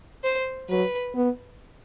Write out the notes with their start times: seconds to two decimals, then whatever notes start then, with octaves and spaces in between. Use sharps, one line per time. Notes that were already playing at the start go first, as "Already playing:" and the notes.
0.24 C5
0.69 F#3 B4
1.15 B3